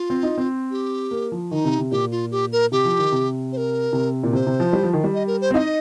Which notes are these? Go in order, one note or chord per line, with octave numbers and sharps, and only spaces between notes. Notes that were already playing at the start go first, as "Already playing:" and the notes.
Already playing: F4
C4
D#4
C4
G4
A#3
F3
D#3 D#4
C3
C3
A#2 G4
F4
G4
A#4
C3 G4
F3
D#3
C3
C5
A#4
C3
A#2
C3 C5
C3
F3
G3
F3
D#3
G3
D#5
A#4
C5
C4
D#4 D#5 F5